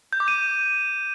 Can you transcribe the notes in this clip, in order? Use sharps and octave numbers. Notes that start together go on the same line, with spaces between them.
G6
D6
D#7